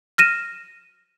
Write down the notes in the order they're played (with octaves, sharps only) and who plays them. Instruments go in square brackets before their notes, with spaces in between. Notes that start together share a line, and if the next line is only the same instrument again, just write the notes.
[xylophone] F6 A#6 D#7 E7